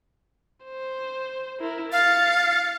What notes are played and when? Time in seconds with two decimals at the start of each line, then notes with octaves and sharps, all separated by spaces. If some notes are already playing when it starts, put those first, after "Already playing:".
0.65 C5
1.61 E4 A#4
1.92 F5 A6 C#7